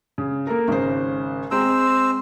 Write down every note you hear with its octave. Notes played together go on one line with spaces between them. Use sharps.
C#3
A#3 A4 A#4
G#1 C#3 C5
G#3 C4 C5 A#5 E6